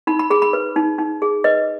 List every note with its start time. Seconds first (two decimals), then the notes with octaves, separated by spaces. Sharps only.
0.07 D#4 B5
0.19 B5
0.30 G#4 B5
0.42 B5
0.53 B4
0.76 D#4
0.99 D#4
1.22 G#4
1.44 B4 D#5